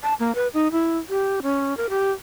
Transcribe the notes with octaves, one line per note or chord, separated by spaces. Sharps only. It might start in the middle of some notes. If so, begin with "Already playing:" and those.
A5
A#3
B4
D#4
E4
G4
C#4
A#4
G4